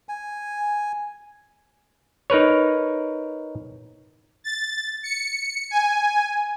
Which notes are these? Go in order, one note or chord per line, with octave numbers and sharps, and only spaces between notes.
G#5
D#4 A#4 B4 C#5
A6
C#7
G#5